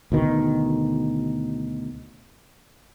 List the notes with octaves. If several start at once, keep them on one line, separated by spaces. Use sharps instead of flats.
D2 B2 D#3